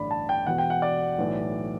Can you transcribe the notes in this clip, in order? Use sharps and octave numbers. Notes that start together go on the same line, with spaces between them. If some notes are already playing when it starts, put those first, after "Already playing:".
Already playing: A1 G2 D3 D5 B5
A5
G5
E1 E2 B2 F#5
G5
F#5
D5
B1 A2 E3